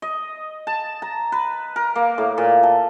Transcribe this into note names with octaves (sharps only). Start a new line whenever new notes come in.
D#5
A5
A#5
B4
A#4
A#3
A2
A#2
A4